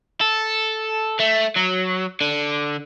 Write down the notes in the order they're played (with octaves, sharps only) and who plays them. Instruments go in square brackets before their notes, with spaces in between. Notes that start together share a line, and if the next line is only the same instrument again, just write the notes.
[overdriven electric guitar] A4
A3
F#3
D3